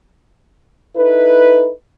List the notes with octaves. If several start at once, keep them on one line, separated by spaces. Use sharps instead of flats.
D#4 E4 A4 B4